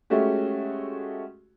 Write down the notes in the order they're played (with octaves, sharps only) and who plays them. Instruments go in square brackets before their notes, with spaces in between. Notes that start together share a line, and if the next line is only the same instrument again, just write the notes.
[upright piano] G#3 A3 C#4 F#4 G4